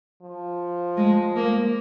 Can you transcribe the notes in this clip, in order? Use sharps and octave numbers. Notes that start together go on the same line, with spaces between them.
F3
G#3
A#3